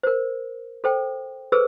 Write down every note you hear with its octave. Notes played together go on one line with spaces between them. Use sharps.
A#4 C5
A4 C5 G5
G#4 A4 B4 C5 E6